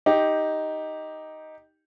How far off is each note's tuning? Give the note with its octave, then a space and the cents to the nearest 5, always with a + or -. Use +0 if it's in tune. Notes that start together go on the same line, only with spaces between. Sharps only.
D#4 +5 G4 +0